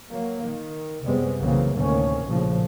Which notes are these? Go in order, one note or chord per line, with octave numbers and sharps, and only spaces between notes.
F#3 A#3
D#3
F#2 C3 G3 G#3 B3 C4
B1 C#3 E3 F#3 A#3 C4
D2 A2 C3 D#3 A#3 C#4
A#1 A2 C#3 F3